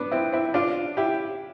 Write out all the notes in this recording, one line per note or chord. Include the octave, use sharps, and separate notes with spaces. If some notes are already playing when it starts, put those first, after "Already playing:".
Already playing: B3 D4
C4 E4
C4 E4
D4 F4
E4 G4